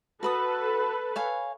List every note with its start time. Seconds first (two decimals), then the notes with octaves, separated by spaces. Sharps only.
0.23 F#4 A4 B4 B5 D#6
1.16 C#5 F5 G#5